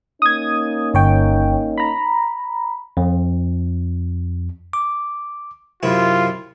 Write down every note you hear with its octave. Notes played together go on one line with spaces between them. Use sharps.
A#3 C#4 D#4 D#6 G#6
G1 C#5 G5
A#5 B5
F2
D6
F#2 C3 E4 F4